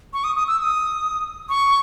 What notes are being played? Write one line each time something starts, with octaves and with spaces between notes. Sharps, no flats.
C#6
D#6
D#6
E6
E6
D#6
C#6